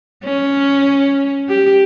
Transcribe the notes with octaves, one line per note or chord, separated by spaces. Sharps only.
C#4
G4